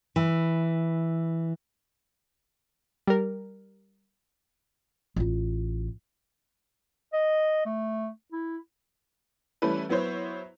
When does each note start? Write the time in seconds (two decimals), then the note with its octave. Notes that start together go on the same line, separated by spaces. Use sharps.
0.16 E3
3.07 G3 A#4
5.16 A1 F4
7.13 D#5
7.65 A3
8.32 E4
9.62 E3 G3 A3 C#4 E4 B4
9.89 F#3 B3 E4 C5 C#5